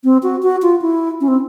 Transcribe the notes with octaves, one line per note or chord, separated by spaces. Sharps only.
C4
F#4
F#4
F4
E4
C#4
C4